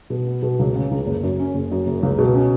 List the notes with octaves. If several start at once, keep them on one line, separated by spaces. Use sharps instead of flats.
B2
B3
B2
C#2
C#3
C#2
F#1
F#2
C#4
F#1
F#2
F#1
C#2
B2
C#4